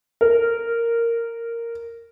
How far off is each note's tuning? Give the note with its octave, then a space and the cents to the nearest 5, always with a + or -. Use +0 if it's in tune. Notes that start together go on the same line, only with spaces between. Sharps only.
A#4 -10